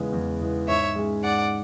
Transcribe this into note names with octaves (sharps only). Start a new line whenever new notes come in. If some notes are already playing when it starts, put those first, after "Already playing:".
Already playing: E2 C#3 E3 G#3 B3
E2
C#3 E3 G#3 B3
G#2 C#5 E5
G#3 C#4 G#4
G#2 D5 F#5